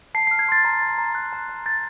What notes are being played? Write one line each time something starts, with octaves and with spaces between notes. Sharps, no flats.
A5 C7
C7
F6
G#6
C6 A6
A#5
A#5
A#5
F#6
A#5
A#5
G6 A6